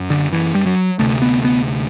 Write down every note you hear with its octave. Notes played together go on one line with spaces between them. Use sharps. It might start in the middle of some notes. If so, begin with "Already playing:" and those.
Already playing: F#2
D3
E3
G3
F#3
D2 C3 A3
B3
B3